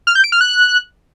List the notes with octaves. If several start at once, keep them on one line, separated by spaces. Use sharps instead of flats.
F6
G6
D7
F6
F#6